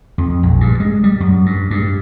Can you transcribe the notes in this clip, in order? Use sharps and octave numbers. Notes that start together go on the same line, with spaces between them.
F2
A#1
G2
G#3
G3
F#2
G2
G2